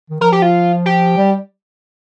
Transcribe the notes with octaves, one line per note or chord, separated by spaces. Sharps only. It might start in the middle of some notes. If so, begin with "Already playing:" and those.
D#3
F3 A#4
G4
F4
G4
G3